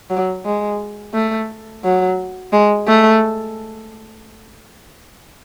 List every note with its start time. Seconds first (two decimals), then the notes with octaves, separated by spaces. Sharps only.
0.10 F#3
0.45 G#3
1.14 A3
1.84 F#3
2.53 G#3
2.88 A3